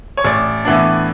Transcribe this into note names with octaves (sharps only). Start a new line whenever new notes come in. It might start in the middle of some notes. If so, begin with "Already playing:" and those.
C#5
A1 D5
A2 E3 B3 D4